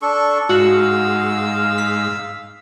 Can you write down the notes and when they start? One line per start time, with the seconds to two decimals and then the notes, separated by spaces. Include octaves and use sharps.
0.02 D4 A4 C#6
0.49 G#2 F#4 F5 F#5 E6
1.78 B6